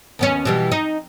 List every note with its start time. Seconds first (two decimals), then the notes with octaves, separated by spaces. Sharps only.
0.19 D#2 B3 C#4
0.45 B2 E3 G3
0.72 D#4